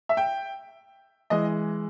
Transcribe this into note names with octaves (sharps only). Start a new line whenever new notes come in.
E5
G5
E3 G#3 D#5